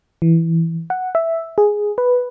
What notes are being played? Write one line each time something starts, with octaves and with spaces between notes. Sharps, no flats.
E3
F#5
E5
G#4
B4